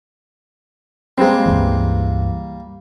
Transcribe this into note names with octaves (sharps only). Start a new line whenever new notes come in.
G3 G#3 A#3 C4
C#2 G2 E3